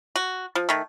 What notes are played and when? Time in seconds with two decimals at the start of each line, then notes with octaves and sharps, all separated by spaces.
0.16 F#4
0.55 F3
0.69 D#3 A3